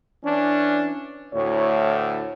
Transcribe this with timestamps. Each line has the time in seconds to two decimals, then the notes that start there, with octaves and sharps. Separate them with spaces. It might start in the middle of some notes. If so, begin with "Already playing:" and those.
0.23 E3 C#4 D4
1.34 D2 A2 C#5